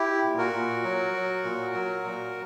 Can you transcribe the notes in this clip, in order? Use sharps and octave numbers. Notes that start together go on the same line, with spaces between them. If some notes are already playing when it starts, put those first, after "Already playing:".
Already playing: E4 G4
A#2
F#4 A#4
A#2
F#3
F#3
A#2
F#3
A#2